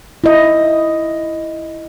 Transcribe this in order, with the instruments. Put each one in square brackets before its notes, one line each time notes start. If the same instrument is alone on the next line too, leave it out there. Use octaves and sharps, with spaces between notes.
[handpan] E4 D#5